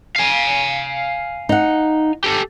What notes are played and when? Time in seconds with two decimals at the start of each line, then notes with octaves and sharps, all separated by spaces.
0.16 F5 G#5
1.49 D#4 F#5
2.24 G4 A4